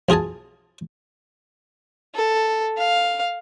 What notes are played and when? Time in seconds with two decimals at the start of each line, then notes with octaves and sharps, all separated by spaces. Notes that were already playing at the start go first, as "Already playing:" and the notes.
0.09 B1 F4 G#4 G#5 A5
2.15 A4
2.77 F5